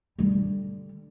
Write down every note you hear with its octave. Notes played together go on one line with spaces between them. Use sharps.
D3 G3